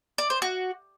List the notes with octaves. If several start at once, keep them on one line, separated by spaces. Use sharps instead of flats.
D5
C5
F#4